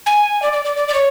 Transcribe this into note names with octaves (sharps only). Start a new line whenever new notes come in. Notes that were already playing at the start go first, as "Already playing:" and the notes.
G#5
D5
D5
D5
D5
D5
C#5